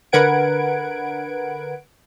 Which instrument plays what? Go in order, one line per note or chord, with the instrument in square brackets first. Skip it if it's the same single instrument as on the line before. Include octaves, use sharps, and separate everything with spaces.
[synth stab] D3 A#4 B4 F#5 G#6 D7